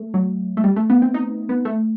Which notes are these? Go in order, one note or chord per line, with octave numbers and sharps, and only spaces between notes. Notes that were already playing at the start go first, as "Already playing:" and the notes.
Already playing: A3
F#3
A3
G3
A3
B3
C4
D#4
B3
A3